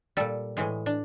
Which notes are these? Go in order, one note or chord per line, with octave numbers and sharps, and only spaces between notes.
A#2 G3 A4
A2 E3 G#3 G#4
D4